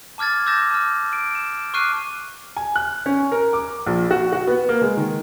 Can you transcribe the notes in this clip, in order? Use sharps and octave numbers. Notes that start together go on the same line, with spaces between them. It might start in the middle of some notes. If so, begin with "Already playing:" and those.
A5 D6 F6 G#6 A6
D6 E6 G6 A6 A#6 E7
A5 F6
D7
E7
C#6 D6 F6 F#6 C7 D#7
G#5
F#6
C#4
A#4
D6
A#1
F#4
F#4
B3
A#3
G#3
D#3